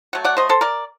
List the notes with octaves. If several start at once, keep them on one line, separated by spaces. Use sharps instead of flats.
F#3 A3 F#5
D5 F#5
C5 D#5
A4 C5
A#4 D5